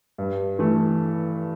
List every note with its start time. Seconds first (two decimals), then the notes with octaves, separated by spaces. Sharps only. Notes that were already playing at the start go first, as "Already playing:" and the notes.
0.18 G2
0.59 E3 A3